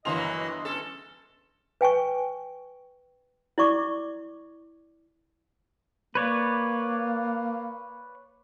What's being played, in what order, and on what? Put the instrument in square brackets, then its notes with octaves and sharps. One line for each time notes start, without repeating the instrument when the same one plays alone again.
[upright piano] G1 C6 F7 [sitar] E3 F#3 A#3 [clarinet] D#5
[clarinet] D#5
[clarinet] C#4 [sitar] A4
[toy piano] B4 G5 G#5 C#6
E4 D5 C#6 D6
[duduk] A#3 [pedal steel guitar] B4 C#5 D5